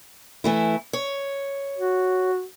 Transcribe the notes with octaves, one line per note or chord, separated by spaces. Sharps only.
E3 A3 E4
C#5
F#4